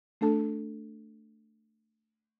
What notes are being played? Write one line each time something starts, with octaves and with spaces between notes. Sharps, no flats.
A3 D4 A4 A5